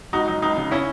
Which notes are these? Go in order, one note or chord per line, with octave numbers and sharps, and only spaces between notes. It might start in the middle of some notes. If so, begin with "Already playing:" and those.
C#2 D#4 F#4
F#3 D#4
C#2 D#4
C#3
C#4 E4